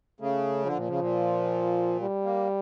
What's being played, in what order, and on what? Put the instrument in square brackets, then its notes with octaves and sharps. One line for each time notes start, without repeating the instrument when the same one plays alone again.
[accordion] C#3 [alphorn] A3
[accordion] D3 [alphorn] F3
[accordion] A#2
C#3
A#2
[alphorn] G3
[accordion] A#3